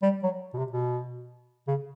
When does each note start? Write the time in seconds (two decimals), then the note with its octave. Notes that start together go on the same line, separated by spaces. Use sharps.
0.02 G3
0.23 F#3
0.54 B2
0.58 C3
0.72 B2
1.68 C#3